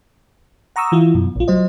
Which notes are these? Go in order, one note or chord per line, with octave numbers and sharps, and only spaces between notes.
F#5 A#5 C#6 D#6 E6
E3 E4 F4
F#2 B2
A#1 F4
F#3 C5 D#5